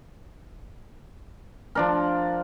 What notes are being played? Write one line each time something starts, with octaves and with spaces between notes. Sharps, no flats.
F3 D4 A#4